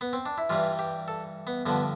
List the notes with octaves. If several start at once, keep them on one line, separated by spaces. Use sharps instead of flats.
B3
C4
D4
E4
G2 E3 G3 F4
G4
A4
B3
G2 D3 F3 B3